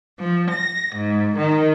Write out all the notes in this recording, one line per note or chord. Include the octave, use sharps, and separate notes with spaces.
F3
A#6
G#2
D#3